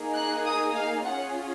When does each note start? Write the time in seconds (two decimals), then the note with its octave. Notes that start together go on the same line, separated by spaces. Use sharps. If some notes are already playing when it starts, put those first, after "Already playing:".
Already playing: A#3 D#4 G#4
0.15 F#6
0.45 D#6
0.75 F5
1.05 C#4 F4 G#4 F#5